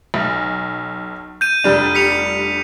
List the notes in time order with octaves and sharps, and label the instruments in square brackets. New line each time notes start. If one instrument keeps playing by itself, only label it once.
[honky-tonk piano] B1
[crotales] G6 D#7
[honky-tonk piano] F1 G3 D4
[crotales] B6 C#7 F7